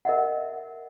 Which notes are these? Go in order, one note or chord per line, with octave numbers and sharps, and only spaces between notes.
A#4 D#5 E5 F#5